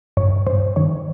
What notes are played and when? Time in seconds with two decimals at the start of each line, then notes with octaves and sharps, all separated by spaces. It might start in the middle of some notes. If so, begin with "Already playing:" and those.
0.17 G2 C#5
0.47 G2 C5
0.76 D#3 C#5